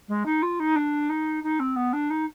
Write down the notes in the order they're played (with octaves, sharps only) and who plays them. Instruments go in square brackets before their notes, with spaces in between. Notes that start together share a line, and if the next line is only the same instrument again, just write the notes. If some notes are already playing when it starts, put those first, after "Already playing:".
[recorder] G#3
D#4
F4
D#4
D4
D#4
D#4
C4
B3
D4
D#4